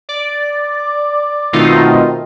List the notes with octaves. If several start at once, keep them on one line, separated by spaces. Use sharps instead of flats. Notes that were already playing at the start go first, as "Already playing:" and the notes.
D5
B2 D#3 A3 C4 D#4 F4